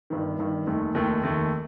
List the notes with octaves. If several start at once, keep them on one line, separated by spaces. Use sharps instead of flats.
G1 G2 D#3
G1 G2 D#3
F1 D#2 D#3 A3
F1 D#2 D#3 A3
F1 D#2 D#3 A3